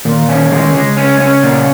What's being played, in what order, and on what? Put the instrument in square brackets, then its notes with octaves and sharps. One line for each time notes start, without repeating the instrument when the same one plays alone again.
[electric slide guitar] A#2 [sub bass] D#3
[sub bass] D#3 [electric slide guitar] C#4
[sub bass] D#3 [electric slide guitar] G#3
[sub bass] C#3 [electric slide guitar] G#3
[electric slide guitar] C#4
C#4
A#2